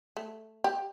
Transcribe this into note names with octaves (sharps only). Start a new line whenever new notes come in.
A3
G4